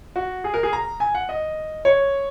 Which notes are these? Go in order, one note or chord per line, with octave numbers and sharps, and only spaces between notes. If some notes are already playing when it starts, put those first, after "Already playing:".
F#4
G#4
A#4
G#4
A#5
G#5
F#5
D#5
C#5